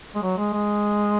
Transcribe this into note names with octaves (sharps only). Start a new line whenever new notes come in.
G#3
F#3
G#3
G#3